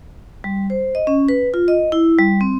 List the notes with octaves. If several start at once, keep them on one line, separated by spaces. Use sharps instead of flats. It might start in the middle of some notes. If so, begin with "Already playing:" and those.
G3
C5
D#5
C#4
B4
F4
D#5
E4
G3
C4